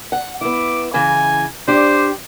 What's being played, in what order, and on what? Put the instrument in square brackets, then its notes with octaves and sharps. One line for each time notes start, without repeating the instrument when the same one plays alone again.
[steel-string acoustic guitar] F#5
[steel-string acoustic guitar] B3 E4 [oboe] D6
[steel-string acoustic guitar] C#3 E3 [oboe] G#5
[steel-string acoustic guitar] D4 G4 [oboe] C5